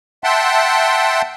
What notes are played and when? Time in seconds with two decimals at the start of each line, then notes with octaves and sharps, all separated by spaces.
0.24 E5 F#5 G5 A5 C6